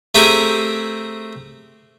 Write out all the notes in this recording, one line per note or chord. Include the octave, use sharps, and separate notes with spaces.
A3 C4 G4 G#4 A#4